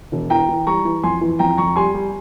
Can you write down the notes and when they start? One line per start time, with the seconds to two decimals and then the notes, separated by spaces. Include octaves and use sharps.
0.12 E1
0.30 E3 G5 A#5
0.49 E3
0.67 G3 A#5 C#6
0.85 E3
1.03 F2 G#5 C6
1.21 E3
1.39 F2 G5 A#5
1.57 F2 A#5 C#6
1.76 G3 G#5 C6
1.94 G3